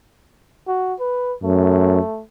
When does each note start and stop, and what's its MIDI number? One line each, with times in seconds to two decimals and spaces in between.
0.67 0.94 66
0.99 1.35 71
1.43 1.99 42
1.43 2.23 57